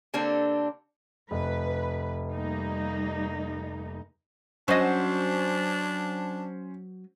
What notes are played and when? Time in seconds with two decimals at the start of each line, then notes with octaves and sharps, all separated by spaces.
0.14 D3 A#3 C4 D4 G4 A4
1.31 F1 B4
2.32 G3 A#3 D#4
4.68 F#3 C#4 D4 C5 D#5